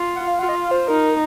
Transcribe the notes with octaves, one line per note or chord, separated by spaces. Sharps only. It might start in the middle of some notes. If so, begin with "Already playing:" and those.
Already playing: F4
F#5
F5
F4 F#5
D#5
F5
C5
D#4 A#4